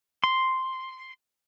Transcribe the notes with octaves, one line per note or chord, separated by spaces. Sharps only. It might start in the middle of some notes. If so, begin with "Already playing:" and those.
C6